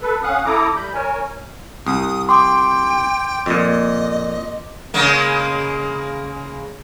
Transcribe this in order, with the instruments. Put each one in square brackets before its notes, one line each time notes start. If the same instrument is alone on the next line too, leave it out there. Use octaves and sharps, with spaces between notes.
[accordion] A4 B4
C#4 F5 F#5 D#6 F#6
E4 A4 A#5 D6 D#6
G3 B5 G6
A#4 C#5 G#5
[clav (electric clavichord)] C2 [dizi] D#6
[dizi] G5 [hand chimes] C6 D6
[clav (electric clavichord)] F2 A#2 [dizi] D#5
[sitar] C#3 G#3 A#3